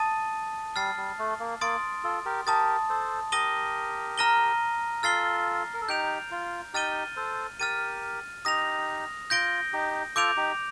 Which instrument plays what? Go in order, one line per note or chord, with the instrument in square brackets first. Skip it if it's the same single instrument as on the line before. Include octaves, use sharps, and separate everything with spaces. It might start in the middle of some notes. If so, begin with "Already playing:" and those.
Already playing: [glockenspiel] A5 D#6 A6 D#7
[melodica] G3 [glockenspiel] F6 A6 C7
[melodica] G3
A3
A#3
[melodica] A#3 [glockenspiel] C6 D#6 A6 D7
[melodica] F4 A4
G4 A#4
[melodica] G4 A#4 [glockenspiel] A5 D#6 A6
[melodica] A4 C5
[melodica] G4 A#4 [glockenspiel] D#6 A#6 D#7 G7
[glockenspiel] A#5 F6 A#6 D#7 G7
[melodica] F4 A4 [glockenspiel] F6 A6 C7 G7
[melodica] A#4
A4
[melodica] D#4 G4 [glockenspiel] G6 D7 F7
[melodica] F4
[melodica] D#4 G4 [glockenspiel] F6 A6 D#7 G7
[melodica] A4 C5
[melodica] G4 A#4 [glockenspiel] F6 A6 D#7
[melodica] D#4 G4 [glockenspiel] D#6 A#6 F7
[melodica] F4 [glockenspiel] G6 A#6 D7 G7
[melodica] D#4 G4
[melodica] F4 A4 [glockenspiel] D6 G6 D7 F7
[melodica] D#4 G4